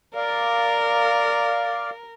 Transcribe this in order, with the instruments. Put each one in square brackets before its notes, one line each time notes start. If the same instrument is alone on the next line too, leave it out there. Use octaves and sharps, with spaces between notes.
[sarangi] A#4 [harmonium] D5 F5